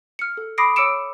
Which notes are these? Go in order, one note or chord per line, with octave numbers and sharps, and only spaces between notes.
F6 C#7
A4
B5 D6 D#6 A#6 C7 D7
C#5 D6 E6 C#7 D7 E7